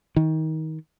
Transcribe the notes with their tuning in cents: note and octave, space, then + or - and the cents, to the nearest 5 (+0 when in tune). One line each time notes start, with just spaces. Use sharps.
D#3 +25